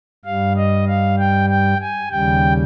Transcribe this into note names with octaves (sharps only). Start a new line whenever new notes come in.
G2 G3 F5
D#5
F5
G5
G5
G#5
D#2 C#3 G3 G5